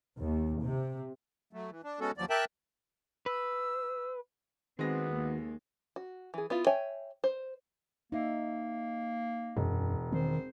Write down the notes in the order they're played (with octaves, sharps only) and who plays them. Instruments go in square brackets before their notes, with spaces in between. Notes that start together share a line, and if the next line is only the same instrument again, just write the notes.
[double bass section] D#2
C3
[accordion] F#3 A3
E3
D4
G#3 B3 C#4 F#4 A4
D#2 F3 F#3 D5
G4 A#4 E5 G5 A5 F#6
[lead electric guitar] B4 [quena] E6
[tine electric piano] D#3 F#4 [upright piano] G#3 A#6 [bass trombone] B3 [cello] C4
[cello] D#2
[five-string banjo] F#4
E3 G#4
B3 E4 F4
C#5 E5 G5 G#5
C5
[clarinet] A#3 [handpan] D#4 E5
[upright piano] E1 [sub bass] F#2 [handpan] G#4
[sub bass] D#3 [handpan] C4 [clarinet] C5